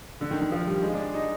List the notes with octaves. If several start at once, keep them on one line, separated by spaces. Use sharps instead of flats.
D3
D#3
D#3
F3
G3
G#3
D4
D#4